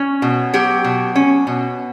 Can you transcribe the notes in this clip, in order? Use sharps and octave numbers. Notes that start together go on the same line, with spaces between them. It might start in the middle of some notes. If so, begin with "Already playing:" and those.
Already playing: C#4
B2
F#3 G4
B2
C#4
B2